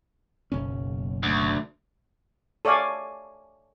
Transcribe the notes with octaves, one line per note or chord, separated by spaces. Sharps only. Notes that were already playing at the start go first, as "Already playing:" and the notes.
F#1 B1 C#4
D2
A4 C#5 D5 F5 G#5